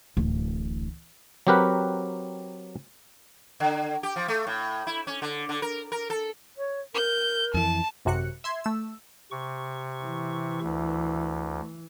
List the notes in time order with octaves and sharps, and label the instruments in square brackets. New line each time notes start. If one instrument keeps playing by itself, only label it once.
[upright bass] D1 A1
[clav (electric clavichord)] F#3 C4 G4 A#4 B4 F#5
[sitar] D3
G4
F3
A3
A2
E4
C#4
D3
D3
A#4
A#4
A4
[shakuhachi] C#5
[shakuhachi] A#4 [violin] G6
[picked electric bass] F2 E3 [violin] A5
[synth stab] G#1 F#2 C3 F#4 F#6 C#7
E5 C6 G#6
A3 E6
[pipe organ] C3 C#6
[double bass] E3
[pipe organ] D2